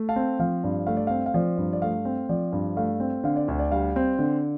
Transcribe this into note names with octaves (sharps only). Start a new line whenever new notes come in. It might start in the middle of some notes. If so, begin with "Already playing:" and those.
Already playing: A3
F5 A5
C4
F3 F5
G2
A3 F5
D5
C4 F5
F5
F3 D5
G2
D5
A3 F5
C4
F3 D5
G2
A3 F5
C4
D3 F5
D5
D2
D5
G3 F5
C4
D3